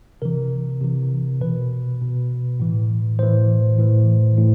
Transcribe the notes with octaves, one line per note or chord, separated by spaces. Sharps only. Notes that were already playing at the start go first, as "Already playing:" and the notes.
C3 E3 A#4
C3 E3
B2 B4
B2
A2 E3
A2 E3 C5
A2 E3
A2